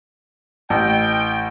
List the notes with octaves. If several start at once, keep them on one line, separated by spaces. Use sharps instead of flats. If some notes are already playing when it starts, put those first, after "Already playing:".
A1 G5